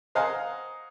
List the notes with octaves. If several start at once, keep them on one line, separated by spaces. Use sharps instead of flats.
C5 D#5 F5 F#5 G#5 A#5